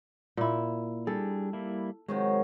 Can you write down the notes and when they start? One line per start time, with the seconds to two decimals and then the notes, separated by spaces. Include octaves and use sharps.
0.37 A#2 E4
1.07 G3 D4 G#4 A4
1.53 G3 A#3 E4
2.08 C3 D#3 F#3 G#3